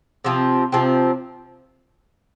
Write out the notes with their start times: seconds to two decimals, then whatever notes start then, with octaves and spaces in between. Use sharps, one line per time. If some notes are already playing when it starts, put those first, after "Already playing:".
0.24 C3 F3 C4
0.72 C3 F3 C4